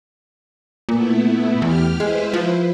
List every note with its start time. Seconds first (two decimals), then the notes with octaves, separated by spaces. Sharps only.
0.89 A#2 A3 B3 E4
1.62 E2 G4 F6
2.00 G#3 E4 B4 C5
2.34 F3